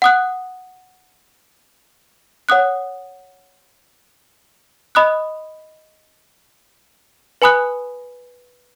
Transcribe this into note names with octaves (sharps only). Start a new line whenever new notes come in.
F#5 D#6 F#6
C#5 F#5 D#6 F#6
D#5 B5 D#6 F#6
B4 G#5 B5 D#6 F#6